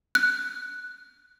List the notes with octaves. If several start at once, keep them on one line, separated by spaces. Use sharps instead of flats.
F#6